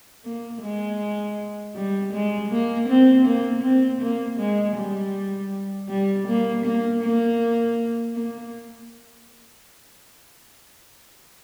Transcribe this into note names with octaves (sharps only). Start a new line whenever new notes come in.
A#3
G#3
G3
G#3
A#3
C4
A#3
C4
A#3
G#3
G3
G3
A#3
A#3
A#3
A#3